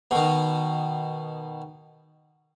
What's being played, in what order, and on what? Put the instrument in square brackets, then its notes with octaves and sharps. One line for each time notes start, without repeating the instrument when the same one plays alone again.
[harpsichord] B2 D#3